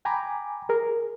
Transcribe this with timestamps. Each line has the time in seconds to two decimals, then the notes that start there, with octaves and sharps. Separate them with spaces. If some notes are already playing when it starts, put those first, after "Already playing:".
0.05 G5 G#5 A#5 B5 D6
0.69 G#4 A#4